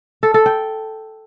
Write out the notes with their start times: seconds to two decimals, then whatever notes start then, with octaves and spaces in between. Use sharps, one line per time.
0.23 A4
0.34 A4
0.46 G5